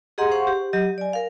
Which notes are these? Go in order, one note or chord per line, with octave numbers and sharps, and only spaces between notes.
G4 G#4 D#5 F#5 A#5 C6
C5 F5 F#5 C6 C#6
G4
F#3 G4 D#5
D5 G#5
A#4 F5